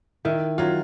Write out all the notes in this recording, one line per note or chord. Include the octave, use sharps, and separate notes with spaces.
D#3 E4
F#3 F4